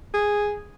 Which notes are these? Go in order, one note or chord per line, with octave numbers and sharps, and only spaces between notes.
G#4